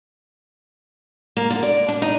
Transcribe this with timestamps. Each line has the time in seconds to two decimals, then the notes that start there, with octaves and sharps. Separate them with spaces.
1.37 A#3
1.50 D3
1.63 D5
1.88 D4
2.02 D#4